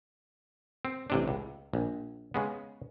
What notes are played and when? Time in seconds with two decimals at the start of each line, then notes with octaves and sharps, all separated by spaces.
0.85 C4
1.10 A1 C3 D4
1.28 C#2
1.73 A#1
2.34 C#3 G#3 B3